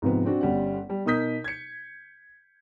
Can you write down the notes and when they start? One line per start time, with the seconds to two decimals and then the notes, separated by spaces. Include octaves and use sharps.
0.02 G#2 C3 F3 B3
0.25 C4 D4 F#4
0.41 G1 G3 C#4 F#5
0.90 G3
1.06 B2 D#4 A#4 D#6 G6 B6
1.44 G#6 C#7